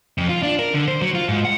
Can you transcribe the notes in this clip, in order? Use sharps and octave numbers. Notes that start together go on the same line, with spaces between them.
F2
F4
D4
A#4
D3
C5
F#3
F4
G#2
F#5